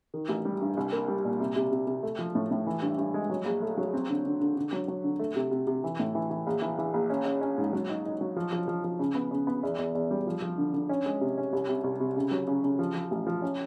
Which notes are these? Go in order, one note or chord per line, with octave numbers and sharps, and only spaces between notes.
D#3
A1
G3
G2
C2
A#3
G3
A#2
C3
C3
C3
C3
A3
F3
A2
A2
E3
G2
G2
G#3
F#3
A#1
A3
F#3
C4
D3
D3
D3
D3
F#3
F#3
D3
A3
C3
C3
C3
E3
A2
E3
E3
A#1
E3
E3
A#1
C#4
C#4
C#4
G#2
F#3
D#4
D#4
F#3
F3
F3
F3
F3
C#3
B3
C#3
B3
E2
E2
E2
G3
F3
F3
D3
D3
C#4
G#3
C3
C#4
C2
C3
C2
C3
C#3
F#3
C#3
C#3
F3
F3
A1
F3
C#4